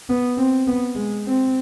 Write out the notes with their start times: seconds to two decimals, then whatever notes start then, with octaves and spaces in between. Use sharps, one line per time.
0.09 B3
0.37 C4
0.67 B3
0.95 G#3
1.25 C4